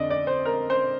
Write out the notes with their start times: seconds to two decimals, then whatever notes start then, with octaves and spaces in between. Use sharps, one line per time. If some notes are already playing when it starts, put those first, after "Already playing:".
Already playing: F2 D3 D5 D#5
0.10 D5
0.27 C5
0.45 A#4
0.70 C5